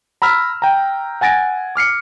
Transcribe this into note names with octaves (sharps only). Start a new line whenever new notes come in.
A#5 B5 E6 F6 B6
G5 A#5
F#5 G#5 A6 A#6 D7
D6 F6 C7 C#7